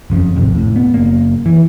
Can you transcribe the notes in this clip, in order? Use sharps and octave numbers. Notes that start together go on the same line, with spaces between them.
F#1 F2 C#3
D1 G#1 F2 C3
A2
B3
F#1 A#3
E3